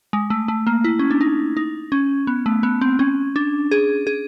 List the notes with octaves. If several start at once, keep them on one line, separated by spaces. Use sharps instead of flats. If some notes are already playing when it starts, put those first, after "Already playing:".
G#3
A3
A3
A#3
E4
C#4
D4
D#4
D#4
C#4
B3
A3
B3
C4
C#4
D4
G#4
G#4